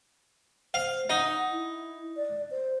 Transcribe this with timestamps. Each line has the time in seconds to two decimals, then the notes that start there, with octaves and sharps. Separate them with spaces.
0.74 C5 F5
1.10 D#4 F#5
1.51 E4
2.16 D5
2.51 C5